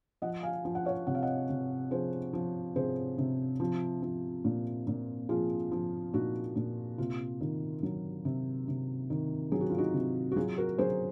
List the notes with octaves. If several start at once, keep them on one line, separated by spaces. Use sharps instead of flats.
F3 D#5 F#5
F5 G#5
F3
F#5
C#5 F5
C3 F#5
F5
D#5 F#5
C3
F3 G#4 C5
F3
C3 G#4 C5
C3
F3
F3
A#2
A#2
F3 F4 G#4
F3
A#2 D#4 F#4
A#2
C3 F4
D#3
F#3
C3
C3
D#3
F#3 G#4
F#4
F4
D#4 F#4
C3
F#4
F#3 F4 G#4
F#4 A#4
F#3 G#4 C5